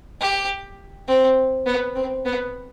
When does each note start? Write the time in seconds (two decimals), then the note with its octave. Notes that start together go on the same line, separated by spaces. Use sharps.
0.21 G4
1.08 C4
1.66 B3
1.96 C4
2.25 B3